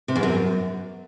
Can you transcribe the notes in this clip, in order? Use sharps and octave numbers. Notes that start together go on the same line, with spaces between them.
C3
E2
F#2